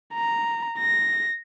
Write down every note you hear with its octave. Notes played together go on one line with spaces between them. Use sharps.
A#5
A#6